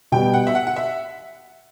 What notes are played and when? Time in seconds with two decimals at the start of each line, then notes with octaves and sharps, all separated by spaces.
0.12 B2 G3 B3 G5
0.33 F#5
0.47 E5
0.55 F#5
0.67 F#5
0.76 E5